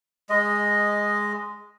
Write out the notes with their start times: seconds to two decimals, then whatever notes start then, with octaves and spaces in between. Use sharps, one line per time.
0.30 G#3 D#5